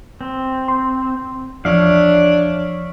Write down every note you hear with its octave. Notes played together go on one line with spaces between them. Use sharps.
C4
C6
E2 F3 D4 C#5 E5 F5